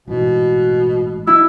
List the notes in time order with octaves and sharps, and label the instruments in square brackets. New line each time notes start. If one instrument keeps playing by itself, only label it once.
[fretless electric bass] A1 G#2 E3 [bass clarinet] B2
[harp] E4 [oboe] E6